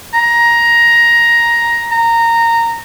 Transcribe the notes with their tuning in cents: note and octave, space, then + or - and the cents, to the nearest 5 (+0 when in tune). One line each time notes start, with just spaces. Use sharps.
A#5 +10
A#5 -15